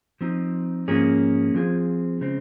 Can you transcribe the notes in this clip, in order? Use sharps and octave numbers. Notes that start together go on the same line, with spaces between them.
F3 C4 D#4
G#2 F3 A#3 C#4 G#4
F3 C4 F4 G#4
C#3 G#3 C4